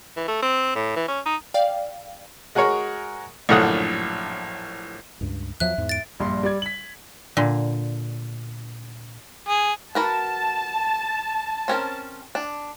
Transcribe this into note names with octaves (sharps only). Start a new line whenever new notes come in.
E3
A3
C4
A2
E3
C#4
D#4
D5 F5 G5
G#3 F#4 G#4 A#4 C#5
A#1 F#2 A2 D3 F#5 D#6
C#2 G2
E2 F3 F#3 E5 F#6
E2 G#2
A6 D7
A#1 G2 C6
G3 D5 G#6
B6 F#7
A#2 D3
G#4
F#4 A#4 B4 A5
C4 C#4 A#4
D4